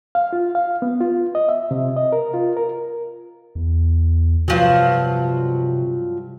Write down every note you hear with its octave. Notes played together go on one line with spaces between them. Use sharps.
F5
F4
F5
B3
F4
D#5
E5
C3
D#5
A#4
F4
A#4
E2
G2 C3 F3 F#3